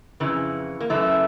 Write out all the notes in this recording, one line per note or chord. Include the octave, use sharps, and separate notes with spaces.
F2 C#3 E3
A#3
F#2 C#3 E3 A3